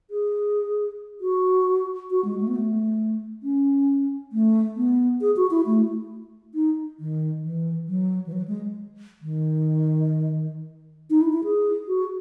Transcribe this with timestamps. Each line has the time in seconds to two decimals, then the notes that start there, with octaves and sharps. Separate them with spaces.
0.10 G#4
1.21 F#4
2.10 F#4
2.25 G#3
2.40 A3
2.47 B3
2.55 A3
3.43 C#4
4.32 A3
4.76 B3
5.21 G#4
5.36 F#4
5.51 E4
5.66 A3
6.54 D#4
7.00 D#3
7.44 E3
7.88 F#3
8.26 E3
8.32 F#3
8.48 G#3
9.22 D#3
11.10 D#4
11.21 E4
11.33 E4
11.44 G#4
11.88 F#4